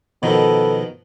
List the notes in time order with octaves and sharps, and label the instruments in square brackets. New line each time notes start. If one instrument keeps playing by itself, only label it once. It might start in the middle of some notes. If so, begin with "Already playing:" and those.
[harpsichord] B2 D#3 F3 [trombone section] B3 A4